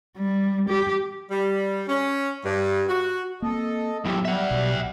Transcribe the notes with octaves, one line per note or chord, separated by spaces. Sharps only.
G3
G4
G3
C#4
G2
F#4
A#3 C4 A4 D#5
A2 F#3 G3 B3 E5
G3 E5 F#5
B1 B2